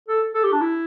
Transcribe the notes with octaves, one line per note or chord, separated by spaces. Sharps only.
A4
A4
G4
D4
E4